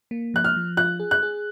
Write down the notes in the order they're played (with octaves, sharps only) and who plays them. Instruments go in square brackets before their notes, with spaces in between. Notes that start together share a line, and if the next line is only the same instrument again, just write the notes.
[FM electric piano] A#3
[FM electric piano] F3 [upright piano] F#6
[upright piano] F6
[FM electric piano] F3
[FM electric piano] F4 [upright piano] F#6
[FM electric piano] G#4
[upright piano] F#6
[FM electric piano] G#4